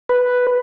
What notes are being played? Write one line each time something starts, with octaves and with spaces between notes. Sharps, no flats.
B4